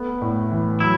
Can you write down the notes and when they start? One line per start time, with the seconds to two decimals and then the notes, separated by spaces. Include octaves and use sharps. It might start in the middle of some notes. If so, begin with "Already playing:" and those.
Already playing: A3 B3
0.21 A2
0.51 E3
0.80 F#3 E4